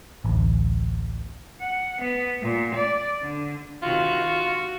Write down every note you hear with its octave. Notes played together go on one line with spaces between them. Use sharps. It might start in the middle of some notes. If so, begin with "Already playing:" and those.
A1 D2
F#5
B3
A#2
D5
D3
C3 D#3 F4 F#4
F#4